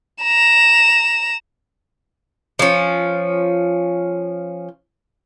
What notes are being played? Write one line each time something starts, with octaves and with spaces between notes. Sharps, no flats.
A#5 E7
F3 C#4